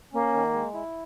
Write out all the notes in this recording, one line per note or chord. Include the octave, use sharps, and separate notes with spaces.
A#3 C#4
D#3
G#3
E4